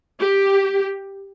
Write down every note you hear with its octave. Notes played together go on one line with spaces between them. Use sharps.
G4